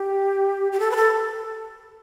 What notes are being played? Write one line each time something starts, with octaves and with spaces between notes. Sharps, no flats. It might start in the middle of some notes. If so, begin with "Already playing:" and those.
Already playing: G4
G4
A4
B4
A4